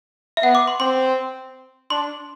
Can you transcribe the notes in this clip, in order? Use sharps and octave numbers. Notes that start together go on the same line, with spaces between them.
E5
B3 F#5
D6
C6
C4 C6
D4 C6